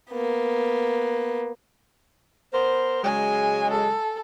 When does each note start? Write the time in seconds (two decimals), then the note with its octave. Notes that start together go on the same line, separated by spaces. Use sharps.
0.10 A#3 B3
2.53 B3 A#4 C5
3.03 C#3 F#3 G#3 G#5
3.70 A4